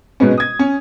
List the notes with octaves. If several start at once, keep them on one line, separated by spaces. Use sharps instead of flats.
G#2 B2 G#3 B3 C#4
D#6 G#6
C#4